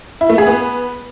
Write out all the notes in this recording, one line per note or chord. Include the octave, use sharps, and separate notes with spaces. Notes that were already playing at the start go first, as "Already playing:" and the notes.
E4
A3
G#4
B3